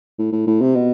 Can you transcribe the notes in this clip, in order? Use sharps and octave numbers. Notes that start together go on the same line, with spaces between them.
A2
A2
A2
C3
B2